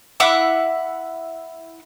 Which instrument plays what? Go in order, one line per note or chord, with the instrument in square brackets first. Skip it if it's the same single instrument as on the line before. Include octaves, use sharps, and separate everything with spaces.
[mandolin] E4 E5 F#5 D6